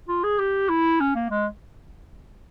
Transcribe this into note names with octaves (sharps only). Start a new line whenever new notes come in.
F4
G#4
G4
E4
C#4
A#3
G#3